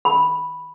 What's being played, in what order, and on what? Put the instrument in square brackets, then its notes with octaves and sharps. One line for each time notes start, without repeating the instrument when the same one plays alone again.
[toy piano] B5